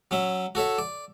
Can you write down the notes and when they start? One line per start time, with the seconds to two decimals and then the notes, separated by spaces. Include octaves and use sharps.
0.11 F#3 C#4 E5
0.55 F#4 A4 C#5 E5
0.78 D5